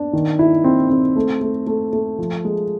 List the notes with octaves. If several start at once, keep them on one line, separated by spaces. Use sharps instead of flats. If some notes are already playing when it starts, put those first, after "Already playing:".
Already playing: B3 D4
D#3
E4
C4
C4
A3
A3
A3
A3
F3
G#3